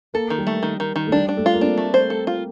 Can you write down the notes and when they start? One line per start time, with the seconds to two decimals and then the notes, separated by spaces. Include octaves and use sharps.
0.14 A#3 A4
0.30 D#3
0.38 G3
0.47 A3
0.63 D#3
0.80 D#3
0.96 D#3
1.07 A3
1.12 G3 D4
1.29 D4
1.37 A3
1.46 F4
1.54 A#3
1.61 C4 D4
1.78 A3
1.94 C5
2.10 A4
2.27 F4